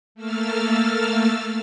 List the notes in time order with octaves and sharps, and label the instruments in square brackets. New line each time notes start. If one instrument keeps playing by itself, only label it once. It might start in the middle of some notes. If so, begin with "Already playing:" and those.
[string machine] A3 A#3 E6 F6 A6